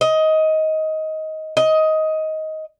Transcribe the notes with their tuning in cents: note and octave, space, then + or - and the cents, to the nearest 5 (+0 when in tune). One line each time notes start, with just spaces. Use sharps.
D#5 +15
D#5 +15